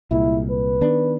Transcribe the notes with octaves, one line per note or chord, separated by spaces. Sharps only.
C2 A#2 G#3 E4
B4
D#3 B3 D4